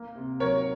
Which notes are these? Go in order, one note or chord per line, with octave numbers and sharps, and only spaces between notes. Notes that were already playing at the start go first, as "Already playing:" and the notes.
Already playing: A#3
C3
F#3 A#4 C#5